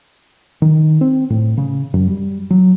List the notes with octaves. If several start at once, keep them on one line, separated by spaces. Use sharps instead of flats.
D#3
C4
A2
C#3
F#2
G3
F#3